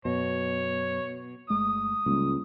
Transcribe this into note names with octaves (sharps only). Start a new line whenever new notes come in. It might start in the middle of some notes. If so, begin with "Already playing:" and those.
F#2 B2 C#5
G1 G#3 A3 D#6
C#2 G3 A#3